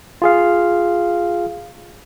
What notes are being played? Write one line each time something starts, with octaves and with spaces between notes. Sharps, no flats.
F4 G#4 F5